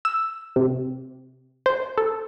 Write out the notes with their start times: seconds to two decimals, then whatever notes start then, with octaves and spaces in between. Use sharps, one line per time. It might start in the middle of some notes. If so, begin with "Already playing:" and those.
0.05 E6
0.56 C3
1.66 C5
1.98 A4